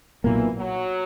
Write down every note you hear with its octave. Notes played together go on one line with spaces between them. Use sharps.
B1 A#2 E3 A#3
F#3